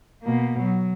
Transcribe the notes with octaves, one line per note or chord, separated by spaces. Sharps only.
B2 A#3
F#3